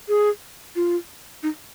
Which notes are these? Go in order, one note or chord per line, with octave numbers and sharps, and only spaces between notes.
G#4
F4
D#4